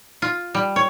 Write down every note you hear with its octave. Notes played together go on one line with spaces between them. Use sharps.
F4
G3
C#5